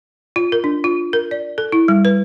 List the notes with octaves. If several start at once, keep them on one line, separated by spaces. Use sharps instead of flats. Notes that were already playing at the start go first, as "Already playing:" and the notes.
F4
A#4
D4
F4
A#4
D5
A4
E4
G3
B4